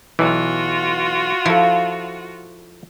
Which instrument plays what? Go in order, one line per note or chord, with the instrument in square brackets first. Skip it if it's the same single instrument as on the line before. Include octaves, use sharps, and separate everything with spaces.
[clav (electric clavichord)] B1 E3 [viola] F4 F#4
[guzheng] F3 [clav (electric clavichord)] E4 A4